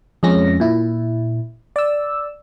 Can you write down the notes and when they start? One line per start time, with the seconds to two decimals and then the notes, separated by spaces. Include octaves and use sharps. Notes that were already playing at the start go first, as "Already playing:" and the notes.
0.23 F2 G#3 C#4 A#6
0.60 A#2 E4
1.76 D5 E6